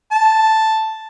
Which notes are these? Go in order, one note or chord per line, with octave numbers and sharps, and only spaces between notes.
A5